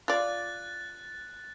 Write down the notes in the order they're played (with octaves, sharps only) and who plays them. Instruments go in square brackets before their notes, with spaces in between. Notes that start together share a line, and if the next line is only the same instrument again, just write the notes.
[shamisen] F4 D5 [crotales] F#6 A6